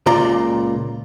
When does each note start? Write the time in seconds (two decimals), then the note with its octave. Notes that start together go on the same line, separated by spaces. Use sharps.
0.06 C#2 A#2 F4 D5 A#5